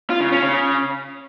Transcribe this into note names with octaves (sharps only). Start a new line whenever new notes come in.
F4
C#3
C#4
C#3